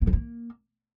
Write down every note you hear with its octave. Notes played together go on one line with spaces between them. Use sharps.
A#3
F3
A#3